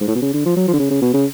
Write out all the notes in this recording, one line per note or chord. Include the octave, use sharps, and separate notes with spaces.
G#2
A2
B2
C#3
D3
F3
F#3
F3
D3
C#3
C#3
B2
C#3